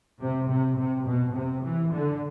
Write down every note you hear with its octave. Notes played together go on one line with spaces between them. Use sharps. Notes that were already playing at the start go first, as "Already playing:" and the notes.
C3
C3
C3
B2
C3
E3
D3